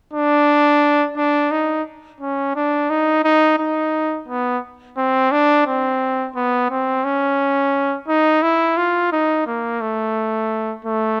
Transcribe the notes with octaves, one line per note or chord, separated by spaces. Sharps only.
D4
D4
D#4
C#4
D4
D#4
D#4
D#4
B3
C4
D4
C4
B3
C4
C#4
D#4
E4
F4
D#4
A#3
A3
A3